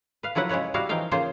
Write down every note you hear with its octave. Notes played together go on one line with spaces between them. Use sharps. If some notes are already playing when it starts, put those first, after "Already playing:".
B4 F5
F3 F#3 E4 B4 F#5
C#3 G#3 B4 C#5 F#5
G3 E4 F#4 F5
E3 F3 D#4 F5 G5
C#3 E3 A#3 F4 C5